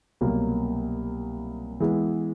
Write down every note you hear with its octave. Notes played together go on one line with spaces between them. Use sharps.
C2 B2 F#3 A#3
E3 G#3 B3